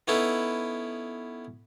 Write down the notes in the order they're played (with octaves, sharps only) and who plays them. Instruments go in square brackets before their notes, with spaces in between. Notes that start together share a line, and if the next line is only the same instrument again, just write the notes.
[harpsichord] B3 C#4 D#4 E4 A4 B4